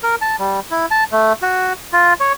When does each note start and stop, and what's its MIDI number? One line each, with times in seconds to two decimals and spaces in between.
0.03 0.15 70
0.22 0.36 81
0.39 0.60 55
0.71 0.86 64
0.91 1.04 81
1.12 1.33 57
1.42 1.73 66
1.93 2.13 65
2.20 2.33 73